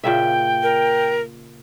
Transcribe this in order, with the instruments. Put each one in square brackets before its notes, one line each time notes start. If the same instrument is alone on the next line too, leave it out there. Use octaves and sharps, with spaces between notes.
[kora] A#2 C#3 E5 [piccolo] G5
[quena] A#4